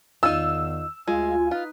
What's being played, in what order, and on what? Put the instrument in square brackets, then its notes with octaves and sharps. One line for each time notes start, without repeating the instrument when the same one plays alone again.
[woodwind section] E2 D#3 [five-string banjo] D#4 F4 [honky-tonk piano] E6
[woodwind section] D2 G#5 [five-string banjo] G#3 [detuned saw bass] F4
[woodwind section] D#4 B4 [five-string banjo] F4